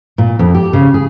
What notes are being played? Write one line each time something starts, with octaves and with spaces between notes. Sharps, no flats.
A#2
F2
G4
C#3
G#4